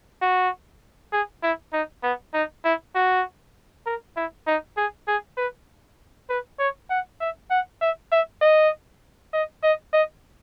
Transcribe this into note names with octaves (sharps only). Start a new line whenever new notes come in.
F#4
G#4
E4
D#4
B3
D#4
E4
F#4
A#4
E4
D#4
G#4
G#4
B4
B4
C#5
F#5
E5
F#5
E5
E5
D#5
D#5
D#5
D#5